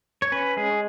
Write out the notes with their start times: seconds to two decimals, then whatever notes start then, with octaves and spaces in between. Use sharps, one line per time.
0.22 C#5
0.32 C#4 B4
0.57 G#3 G#4